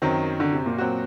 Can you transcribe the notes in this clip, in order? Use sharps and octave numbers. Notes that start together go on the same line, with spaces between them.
F#2 D#3 F#3 C4
D3
C3
A#2
F#3 C4 F#4